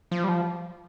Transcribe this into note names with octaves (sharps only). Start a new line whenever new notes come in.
F3
G3
F3